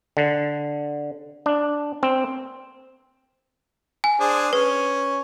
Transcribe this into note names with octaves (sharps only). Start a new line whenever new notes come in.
D3
D4
C4
G#5
D4 G#4 C5
C#4 B4